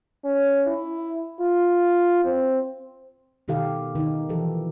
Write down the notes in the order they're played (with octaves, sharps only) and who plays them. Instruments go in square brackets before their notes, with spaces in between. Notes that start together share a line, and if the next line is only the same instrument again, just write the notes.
[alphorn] C#4
E4
F4
C4
[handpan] B2 D#3 G4 A4 F5
D#3 D#4
E3 F3 G4 A4